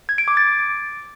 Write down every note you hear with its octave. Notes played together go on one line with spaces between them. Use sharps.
G#6
D7
D6
A6